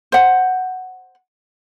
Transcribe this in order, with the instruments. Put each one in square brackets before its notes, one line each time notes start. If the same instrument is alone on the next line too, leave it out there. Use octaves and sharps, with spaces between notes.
[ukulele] C5 F#5